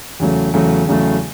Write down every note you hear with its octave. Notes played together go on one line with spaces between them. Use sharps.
E2 C#3 F#3 A3
E2 C#3 F#3 A3
E2 C#3 F#3 A3